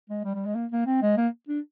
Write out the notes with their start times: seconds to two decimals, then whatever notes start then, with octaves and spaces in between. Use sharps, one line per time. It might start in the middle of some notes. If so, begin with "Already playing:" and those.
0.10 G#3
0.24 G3
0.35 G3
0.46 G#3
0.55 A#3
0.72 A#3
0.86 C4
1.02 G#3
1.17 A#3
1.48 D4